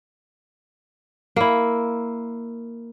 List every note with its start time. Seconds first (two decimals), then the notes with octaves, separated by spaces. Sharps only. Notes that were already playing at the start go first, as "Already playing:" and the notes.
1.36 A#3 E4